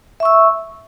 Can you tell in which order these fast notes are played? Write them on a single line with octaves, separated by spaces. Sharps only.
E5 C#6 E6